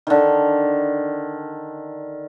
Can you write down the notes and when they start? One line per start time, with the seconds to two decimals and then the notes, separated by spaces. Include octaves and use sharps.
0.07 D3 D#3